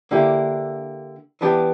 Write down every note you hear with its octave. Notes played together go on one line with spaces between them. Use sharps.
D3 A#3 E4 G4
E3 B3 D4 G4